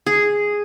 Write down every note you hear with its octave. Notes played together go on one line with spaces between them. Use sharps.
G#4